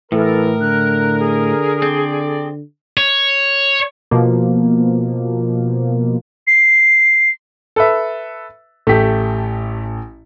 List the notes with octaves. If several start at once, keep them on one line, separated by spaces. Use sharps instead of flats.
A2 E3 A4 A#4
D3 F#6
G#4
C4 A4 D5
C#5
B2 F3 A#3
C7
A4 B4 E5
A1 A3 G4 B6